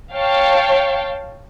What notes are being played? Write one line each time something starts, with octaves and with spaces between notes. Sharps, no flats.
C#5 F5 G5 A5